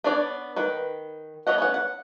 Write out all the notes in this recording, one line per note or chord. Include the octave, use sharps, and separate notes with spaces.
B3 D4 C#5 D5
D#3 B4
B3 C#5 D#5 F#5
B3 C#4 F#5
F#5